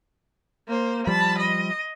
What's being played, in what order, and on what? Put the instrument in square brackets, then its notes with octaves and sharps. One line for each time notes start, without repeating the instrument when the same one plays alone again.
[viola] A#3 C5
[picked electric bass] F3 G3 [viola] A5 B5
[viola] D#5